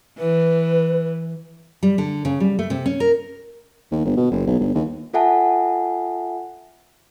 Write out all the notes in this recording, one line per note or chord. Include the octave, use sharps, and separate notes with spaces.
E3 B4
G3
D3
C#3
G3
A3
C3
C#4
A#4
D#2
G1
B2
F#1
B1
G1
D#2
F4 A4 E5 F#5 G#5 A5